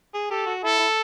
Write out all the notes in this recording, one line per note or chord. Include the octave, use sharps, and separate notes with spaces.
G#4
G4 A4
F#4
E4 A4
E4